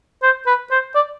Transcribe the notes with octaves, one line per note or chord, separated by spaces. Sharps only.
C5
B4
C5
D5